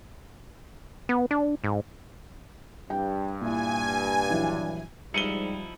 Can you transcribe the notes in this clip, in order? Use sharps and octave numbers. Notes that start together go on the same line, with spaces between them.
B3
D4
G#2
G2 G5
A#2 E4 G#5
A#1 E3 F#3
G#2 F3 G3 D#4 E4 C#7 D#7 G7